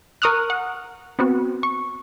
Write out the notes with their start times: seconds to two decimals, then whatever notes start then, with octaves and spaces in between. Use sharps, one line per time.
0.22 A#4 C#6 D#6 F6 F#6
0.50 F#5
1.19 B3 C4 F#4
1.63 C#6